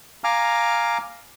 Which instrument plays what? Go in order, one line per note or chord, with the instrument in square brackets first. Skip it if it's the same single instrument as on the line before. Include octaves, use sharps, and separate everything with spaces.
[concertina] F5 G#5 A#5 D6 F6